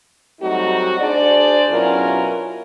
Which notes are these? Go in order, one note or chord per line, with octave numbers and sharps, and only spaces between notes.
F#3 G3 A3 C4 D#4 F#4
D4 G#4 C5 D5
B2 F#3 C#4 E4 F4 A#4